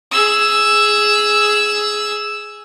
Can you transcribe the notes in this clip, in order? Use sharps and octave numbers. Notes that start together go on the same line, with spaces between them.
G#4 E6